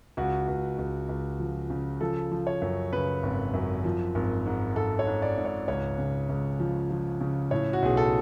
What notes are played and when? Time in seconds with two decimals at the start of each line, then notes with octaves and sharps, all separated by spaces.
0.17 C#2 F#4
0.48 C#2
0.78 C#2
1.09 C#2
1.40 F3
1.70 C#3
2.01 F3 A4
2.32 F3
2.47 C#5
2.62 F#2
2.92 C#3 B4
3.23 G#1
3.54 F#2
3.84 F3
4.15 G#1
4.46 G#2
4.76 G#1 A4
4.99 C#5
5.07 G#2
5.22 D5
5.38 G#2
5.45 C#5
5.68 C#2 C#5
5.98 C#3
6.29 C#2
6.60 F3
6.90 F3
7.21 C#3
7.51 A2 C#5
7.73 F#4
7.82 B1 G#4
7.97 A4